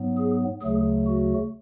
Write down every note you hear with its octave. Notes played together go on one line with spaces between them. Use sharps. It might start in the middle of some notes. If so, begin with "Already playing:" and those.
Already playing: G#2 F#3 B3
G#4
D2 C#3 F#3 A3 G#4
F#4